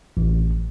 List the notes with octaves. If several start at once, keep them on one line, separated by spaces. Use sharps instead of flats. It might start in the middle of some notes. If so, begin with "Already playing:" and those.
A1